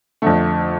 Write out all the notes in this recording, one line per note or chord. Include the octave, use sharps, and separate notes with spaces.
F2 D3 A3